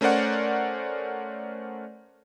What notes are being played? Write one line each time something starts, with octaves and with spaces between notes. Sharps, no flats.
A3 C#4 A#4 C5 D5 F#5